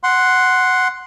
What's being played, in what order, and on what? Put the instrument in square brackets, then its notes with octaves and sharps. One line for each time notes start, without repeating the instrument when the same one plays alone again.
[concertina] F#5 C6